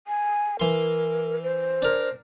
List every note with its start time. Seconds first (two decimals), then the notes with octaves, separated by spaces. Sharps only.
0.07 G#5
0.60 E3 A#4 C6
1.42 C5
1.82 D4 A#4